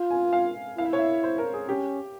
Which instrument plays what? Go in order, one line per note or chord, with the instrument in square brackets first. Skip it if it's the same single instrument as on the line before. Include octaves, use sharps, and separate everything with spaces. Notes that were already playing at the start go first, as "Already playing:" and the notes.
Already playing: [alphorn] F4
[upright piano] G#5
F5
[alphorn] E4 [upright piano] F5
[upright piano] E5
C#5
E5
C5
A#4
G#4
[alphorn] C#4 [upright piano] G4